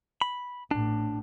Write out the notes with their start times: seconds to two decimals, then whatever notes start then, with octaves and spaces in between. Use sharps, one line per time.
0.21 B5
0.71 A1 A2 D4